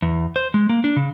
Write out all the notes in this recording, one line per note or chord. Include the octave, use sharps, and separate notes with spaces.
E2
C5
G#3
A#3
D4
C#3